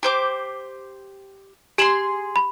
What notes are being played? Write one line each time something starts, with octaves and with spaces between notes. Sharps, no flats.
G4 C5 D6
G4 G#4 C6 E7 F#7
B5